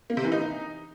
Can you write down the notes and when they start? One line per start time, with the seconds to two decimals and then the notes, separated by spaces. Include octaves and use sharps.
0.10 A#3
0.17 C3
0.24 E3
0.32 D#4